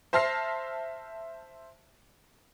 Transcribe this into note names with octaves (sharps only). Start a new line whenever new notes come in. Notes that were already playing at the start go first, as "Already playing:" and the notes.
C5 E5 A5 F6 A#6 C7